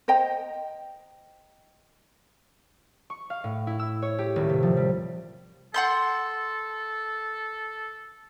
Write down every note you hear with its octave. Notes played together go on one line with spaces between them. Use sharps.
C5 D#5 G5 A#5
C#6
F5
A2
E4
E6
C#5
G4
D#1
C3
F3
G3
A4 F#5 C6 G6